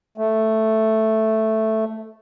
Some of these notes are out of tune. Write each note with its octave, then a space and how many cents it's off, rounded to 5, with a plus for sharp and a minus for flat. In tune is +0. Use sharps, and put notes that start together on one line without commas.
A3 +0